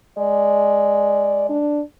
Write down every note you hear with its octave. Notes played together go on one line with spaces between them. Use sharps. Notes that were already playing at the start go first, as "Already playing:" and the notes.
G#3 D5
D4